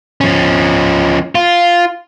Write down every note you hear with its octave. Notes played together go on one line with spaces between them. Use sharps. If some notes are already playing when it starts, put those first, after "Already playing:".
F3 C#4
F4